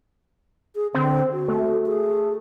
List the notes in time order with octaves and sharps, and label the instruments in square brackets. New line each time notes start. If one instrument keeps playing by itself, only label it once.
[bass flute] G#4
[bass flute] D3 [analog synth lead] C4
[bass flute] F#4
[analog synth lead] A3
[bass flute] G#4